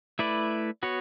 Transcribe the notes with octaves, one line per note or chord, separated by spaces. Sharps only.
A3 E4 B4 D5
B3 F#4 C#5